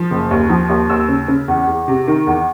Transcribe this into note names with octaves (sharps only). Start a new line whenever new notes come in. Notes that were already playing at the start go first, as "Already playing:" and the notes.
Already playing: F3
F#1
D#2
F3
D#2
D#2 E6
C#3
C#3
E2
E2
C3
D#3
E2